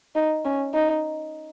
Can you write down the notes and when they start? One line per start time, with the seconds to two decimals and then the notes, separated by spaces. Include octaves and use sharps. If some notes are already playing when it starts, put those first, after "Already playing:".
0.15 D#4
0.45 C#4
0.74 D#4